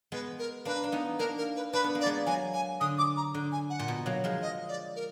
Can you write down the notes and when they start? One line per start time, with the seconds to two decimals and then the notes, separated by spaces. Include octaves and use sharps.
0.12 G#3 B3 B4
0.39 A#4
0.65 A#3 D4 B4
0.84 D4
0.92 B3 D#4
1.19 A#3 D4 A#4
1.38 A#4
1.56 B4
1.73 D4 B4
1.84 B3
1.95 A#3
2.01 D5
2.06 G#3 B3
2.26 F#3 A#3 G#5
2.53 G#5
2.81 D3 D#6
2.98 D6
3.17 A#5
3.34 D3
3.52 G#5
3.70 F#5
3.79 A#2
3.88 B2
4.06 F#3 A#3
4.24 F3 G#3
4.42 D#5
4.68 D5
4.96 A#4